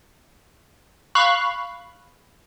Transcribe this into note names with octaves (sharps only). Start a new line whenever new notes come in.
F5 B5 C#6 F#6